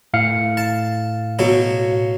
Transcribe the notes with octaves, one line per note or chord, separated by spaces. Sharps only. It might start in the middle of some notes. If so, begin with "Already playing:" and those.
A2 F5 C#7
A5
B2 F#3 A4